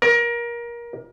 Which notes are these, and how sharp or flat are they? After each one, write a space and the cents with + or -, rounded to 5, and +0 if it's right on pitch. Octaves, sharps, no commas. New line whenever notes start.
A#4 +25